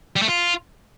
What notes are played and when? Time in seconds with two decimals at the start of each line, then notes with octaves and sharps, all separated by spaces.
0.16 G3
0.22 A3
0.28 F4